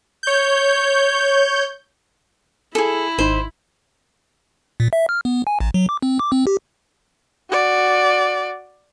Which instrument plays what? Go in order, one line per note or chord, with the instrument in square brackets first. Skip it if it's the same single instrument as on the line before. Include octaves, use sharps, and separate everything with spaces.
[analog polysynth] C#5 G6
[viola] E4 [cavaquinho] G#4 A4
[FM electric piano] G#1 D#4 B5 [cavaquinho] C5
[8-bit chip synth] A#2
E5
F6
B3
G#5
A1
F#3
D6
C4
D6
C4
G4
[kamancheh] F#4 D5